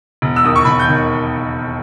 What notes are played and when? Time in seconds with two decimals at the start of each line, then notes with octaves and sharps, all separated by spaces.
0.22 E1
0.36 E6
0.44 D#2 D#3 D#6
0.56 C#6
0.65 E1 B5
0.80 G6
0.88 D#3